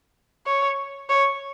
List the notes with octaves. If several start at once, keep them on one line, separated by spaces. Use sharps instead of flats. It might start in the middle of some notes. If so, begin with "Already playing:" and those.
C#5
C#5